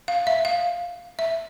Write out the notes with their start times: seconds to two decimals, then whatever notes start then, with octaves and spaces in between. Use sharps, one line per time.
0.08 F5
0.27 E5
0.45 F5
1.19 E5